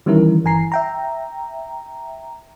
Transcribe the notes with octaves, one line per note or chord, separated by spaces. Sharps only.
D#3 E3 G3 C#4 E4 A#4
G1 E3 G#5 A#5 C7
E5 G5 A#5